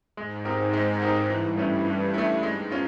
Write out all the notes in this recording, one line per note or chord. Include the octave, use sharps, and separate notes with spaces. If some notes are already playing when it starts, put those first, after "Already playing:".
G#2 G#3
C4 D#4 G4 A#4
G#3
C4 D#4 G4 A#4
G2 E3
A3 C#4 E4
E3
A3 C#4 E4
G#2 G#3
C#4 F4